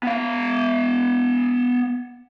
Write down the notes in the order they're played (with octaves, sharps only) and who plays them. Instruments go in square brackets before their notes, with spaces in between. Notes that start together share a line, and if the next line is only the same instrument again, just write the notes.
[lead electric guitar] B3 F5